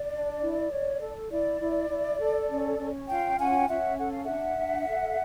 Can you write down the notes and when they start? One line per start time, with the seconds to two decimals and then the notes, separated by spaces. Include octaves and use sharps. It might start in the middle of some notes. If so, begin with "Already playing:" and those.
Already playing: D5
0.12 D4
0.41 E4
0.71 C#5
1.01 A4
1.30 E4 D5
1.60 E4
1.90 E4
2.20 A4
2.49 C#4
2.78 C#4
3.09 F4 F5 G5
3.38 C#4 F#5 G#5
3.56 G5
3.68 C#4 E5 F#5
3.98 A4 F#5
4.12 F5
4.24 D4 E5 F#5
4.57 D4
4.87 A4